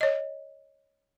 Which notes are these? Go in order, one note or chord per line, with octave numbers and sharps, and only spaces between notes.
C#5 D#5